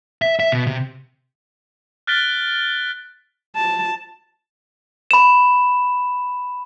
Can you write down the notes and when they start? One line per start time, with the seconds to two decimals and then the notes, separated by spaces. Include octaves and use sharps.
0.22 E5
0.40 E5
0.52 B2
0.67 C3
2.07 F6 F#6 A6 B6 D7 G7
3.56 A5
5.11 B5 E7